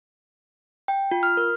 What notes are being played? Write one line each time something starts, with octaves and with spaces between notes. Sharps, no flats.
G5
F4
F6
A#4